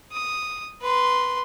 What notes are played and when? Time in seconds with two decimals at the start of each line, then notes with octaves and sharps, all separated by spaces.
0.12 D#6
0.82 B4 C6